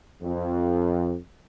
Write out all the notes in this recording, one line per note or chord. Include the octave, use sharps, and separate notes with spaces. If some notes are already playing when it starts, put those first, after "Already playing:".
F2